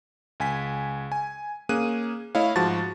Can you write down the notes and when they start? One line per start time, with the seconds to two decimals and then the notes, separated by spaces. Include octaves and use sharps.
0.40 C#2 G#5 B6
1.12 G#5
1.69 A#3 C#4 G#4 F#6 D#7
2.35 A3 E4 C#5 D#5 F5
2.56 G#2 F3 F#4 A5 A6